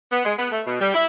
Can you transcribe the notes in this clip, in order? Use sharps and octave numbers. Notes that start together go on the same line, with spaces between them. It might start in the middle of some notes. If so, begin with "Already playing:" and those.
B3
G#3
B3
A3
B2
G3
E4